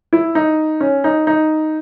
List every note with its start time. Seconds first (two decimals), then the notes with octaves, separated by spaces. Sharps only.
0.13 E4
0.35 D#4
0.80 C#4
1.04 D#4
1.27 D#4